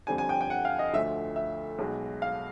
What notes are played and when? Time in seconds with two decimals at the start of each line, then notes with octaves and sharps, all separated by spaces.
0.07 F2 D3 G3 C4 G#5
0.18 G#5
0.29 G5
0.41 G5
0.50 F#5
0.65 F5
0.79 D#5
0.93 D2 D3 F3 A3 E5
1.36 E5
1.79 B1 B2 G#3
2.22 F5